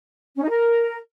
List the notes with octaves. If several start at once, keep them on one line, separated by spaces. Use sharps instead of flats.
C#4
D#4
A#4